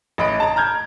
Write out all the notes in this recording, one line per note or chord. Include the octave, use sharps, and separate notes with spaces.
A1 D#5 B5 D7
A5 A#5
A#5 F6 G6 G#6